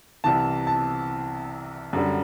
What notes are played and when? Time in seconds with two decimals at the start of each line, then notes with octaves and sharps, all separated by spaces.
0.24 C2 C3 E3 A5
0.67 A5
1.93 F#2 D3 G3